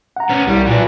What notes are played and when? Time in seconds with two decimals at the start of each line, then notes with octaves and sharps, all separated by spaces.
0.16 F#5 A#5
0.29 B3 C#4
0.47 C2 G3
0.67 A#2 F#3 B4